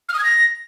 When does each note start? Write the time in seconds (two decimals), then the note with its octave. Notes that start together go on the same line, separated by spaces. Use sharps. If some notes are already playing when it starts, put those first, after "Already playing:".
0.09 F6
0.14 D#6
0.19 G#6
0.24 A#6